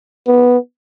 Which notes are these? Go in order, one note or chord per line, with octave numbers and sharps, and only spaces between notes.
B3